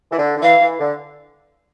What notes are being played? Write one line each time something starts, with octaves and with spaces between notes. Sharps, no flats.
E3
D3
D3
E3 F5
E3
D3